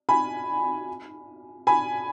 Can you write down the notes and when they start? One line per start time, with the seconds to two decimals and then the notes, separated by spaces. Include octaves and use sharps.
0.09 G#5 B5
1.67 G#5 B5